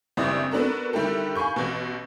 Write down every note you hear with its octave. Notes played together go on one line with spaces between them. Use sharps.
F#1 G2 C4 E4 D5 D#6
B3 D4 F#4 A4 A#4
D3 D#3 G3 E4 G4 A4
F5 G#5 B5 C#6 G6
A1 B2